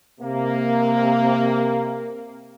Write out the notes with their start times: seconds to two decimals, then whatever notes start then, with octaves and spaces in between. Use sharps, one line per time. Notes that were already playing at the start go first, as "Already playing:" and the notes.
0.21 C3 A#3